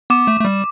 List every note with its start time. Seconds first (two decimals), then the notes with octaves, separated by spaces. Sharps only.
0.10 B3 D6
0.27 A3
0.41 A3
0.45 G3